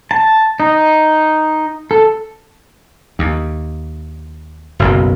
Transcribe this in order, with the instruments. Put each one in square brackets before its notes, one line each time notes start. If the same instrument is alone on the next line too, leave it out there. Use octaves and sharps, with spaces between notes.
[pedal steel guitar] A5
D#4
A4
[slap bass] D#2
F#1 B1 F#2